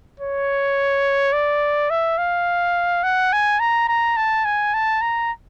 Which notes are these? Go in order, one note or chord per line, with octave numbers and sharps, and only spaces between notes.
C#5
D5
E5
F5
F#5
G#5
A#5
A#5
A5
G#5
A5
A#5